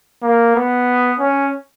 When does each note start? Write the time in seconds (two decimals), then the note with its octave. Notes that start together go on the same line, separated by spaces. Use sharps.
0.22 A#3
0.55 B3
1.19 C#4